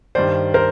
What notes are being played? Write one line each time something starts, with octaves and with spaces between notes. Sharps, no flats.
G2 D#3 C5 D5
A#4 C5